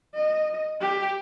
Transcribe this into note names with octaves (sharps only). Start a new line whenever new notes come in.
D#5
G4